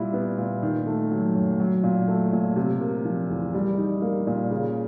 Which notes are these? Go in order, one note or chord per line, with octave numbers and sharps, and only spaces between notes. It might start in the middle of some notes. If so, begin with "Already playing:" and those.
Already playing: A#2 G3 E4
B3
A#2
D#3
A3
F#3
F#2
F#3
A#2
A3
A#2
C3
A#3
F3
E2
G3
D#4
A#3
A#2
C#3